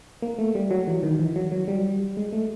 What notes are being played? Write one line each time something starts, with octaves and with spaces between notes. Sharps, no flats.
A#3
A3
G3
F#3
E3
D#3
E3
F#3
F#3
G3
G#3
A3